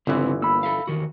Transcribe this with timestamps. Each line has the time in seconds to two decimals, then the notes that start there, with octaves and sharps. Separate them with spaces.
0.07 G1 C#3 E3 C4 E4
0.42 A#3 B5 E6
0.63 A4 E5 F5
0.87 E2 D#3 F#4